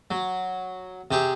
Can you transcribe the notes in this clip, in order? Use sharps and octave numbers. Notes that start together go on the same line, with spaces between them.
F#3
C3 G4 G#4